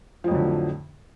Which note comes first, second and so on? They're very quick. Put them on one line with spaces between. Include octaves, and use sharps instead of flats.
F3 F2 F#3 D3 A2